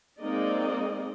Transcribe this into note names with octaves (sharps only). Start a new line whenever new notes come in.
G#3 A#3 C4 D#4 D5 D#5